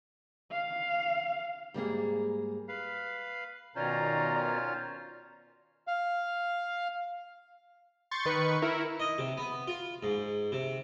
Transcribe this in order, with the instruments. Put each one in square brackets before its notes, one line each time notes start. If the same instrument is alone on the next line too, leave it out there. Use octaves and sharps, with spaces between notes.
[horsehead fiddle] F5
[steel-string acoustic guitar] G#2 G3 A#3 G#4
[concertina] B4 F5
[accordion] B2 D#3 [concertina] C#4 F4 C5 [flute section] D5 A#5
[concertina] F5
[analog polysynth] C6 C#6 G6 A6
D#3 B4 C#6 C#7
E4 A#4
[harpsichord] D#5
C3
B3
F4
G#2
C3